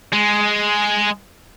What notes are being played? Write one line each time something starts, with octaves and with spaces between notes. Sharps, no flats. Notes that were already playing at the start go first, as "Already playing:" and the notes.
G#3